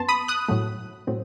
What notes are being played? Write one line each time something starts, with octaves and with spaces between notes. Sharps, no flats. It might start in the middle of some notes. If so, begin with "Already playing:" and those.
Already playing: F#2 B3 A5 C6
B5 D#6
D#6 F#6
A2 F#3 A3
A2 F#3 C4